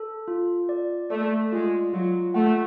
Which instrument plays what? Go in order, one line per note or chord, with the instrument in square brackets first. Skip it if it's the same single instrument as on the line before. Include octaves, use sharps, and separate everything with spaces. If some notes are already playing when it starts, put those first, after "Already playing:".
Already playing: [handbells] A4
F4
D5
[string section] A3 [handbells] D5
[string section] G#3 [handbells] F4
[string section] F#3 [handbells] F4
[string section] A3 [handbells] F#5